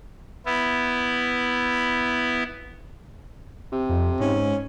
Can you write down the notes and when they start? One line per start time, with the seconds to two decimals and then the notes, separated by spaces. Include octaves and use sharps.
0.46 B3 E4
3.72 C3
3.89 F2
4.20 G#2 C#4